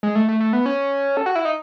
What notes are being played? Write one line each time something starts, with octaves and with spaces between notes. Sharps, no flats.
G#3
A3
A3
A3
B3
C#4
A4
F#4
E4
D#4